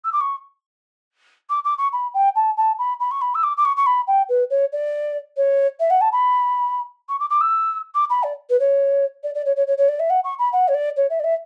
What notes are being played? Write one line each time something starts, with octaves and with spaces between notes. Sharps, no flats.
E6
D6
C#6
D6
D6
C#6
B5
G5
A5
A5
B5
B5
C#6
B5
E6
D6
D6
C#6
C#6
B5
G5
B4
C#5
D5
C#5
E5
F#5
A5
B5
C#6
D6
D6
E6
D6
B5
D5
B4
C#5
D5
D5
C#5
C#5
C#5
C#5
D5
E5
F#5
C#6
B5
F#5
C#5
D5
C#5
E5
D5
E5